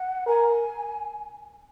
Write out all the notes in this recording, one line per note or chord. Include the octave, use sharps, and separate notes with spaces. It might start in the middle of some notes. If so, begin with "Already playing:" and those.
Already playing: F#5
A#4 G#5